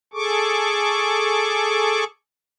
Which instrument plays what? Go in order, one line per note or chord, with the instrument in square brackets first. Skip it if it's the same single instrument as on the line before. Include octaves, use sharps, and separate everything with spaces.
[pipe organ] G#4 A4 C#6 D6